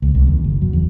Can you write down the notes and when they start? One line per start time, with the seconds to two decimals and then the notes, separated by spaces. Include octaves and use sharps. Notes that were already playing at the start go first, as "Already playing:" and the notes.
0.02 C#2
0.15 C2
0.27 D#2
0.44 F#1
0.61 F#3
0.73 E2